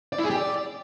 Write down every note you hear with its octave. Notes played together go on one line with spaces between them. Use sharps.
D5
E4
G#4
G4
D5